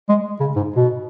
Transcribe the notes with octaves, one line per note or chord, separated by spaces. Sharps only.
G#3
C#3
G#2
B2